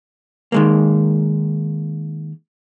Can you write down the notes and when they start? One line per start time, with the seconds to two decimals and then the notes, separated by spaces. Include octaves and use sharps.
0.52 D#3 G#3 A#3